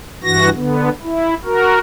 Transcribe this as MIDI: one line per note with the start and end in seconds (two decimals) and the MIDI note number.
0.24 0.49 43
0.24 0.49 52
0.24 0.49 66
0.24 0.49 94
0.55 0.89 50
0.55 0.89 59
1.03 1.34 64
1.45 1.79 66
1.45 1.79 70